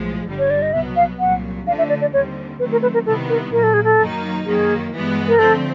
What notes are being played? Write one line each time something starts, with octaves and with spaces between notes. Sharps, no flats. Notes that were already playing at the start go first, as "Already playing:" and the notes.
Already playing: B1 A2 F3 G#3
G1 G2 D3 G3
C#5
D5
D#5
C2 B2 F#3 B3 E5
F5
C2 A#2 F#3 F#5
D3 F3 A3 D4 F5
E5
D5
D5
D#2 D3 G3 C4 C#5
D#3 F#3 A3 C4 B4
A#4
B4
A#4
C3 D#3 G3 B3 E4 A4
A#4
A#2 F#3 A#3 A#4
A4
G#4
A4
F#2 D#3 F#3 A#3 D#4
F#2 D#3 F#3 A#3 G#4
G2 E3 G#3 B3
A#4
D3 F3 A3 C4 A4